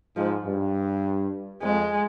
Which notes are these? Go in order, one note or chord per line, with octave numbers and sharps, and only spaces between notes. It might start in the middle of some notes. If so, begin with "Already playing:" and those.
G#2 F3
G2
F2 G#3